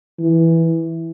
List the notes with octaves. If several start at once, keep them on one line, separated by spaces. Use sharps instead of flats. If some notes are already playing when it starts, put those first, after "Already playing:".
E3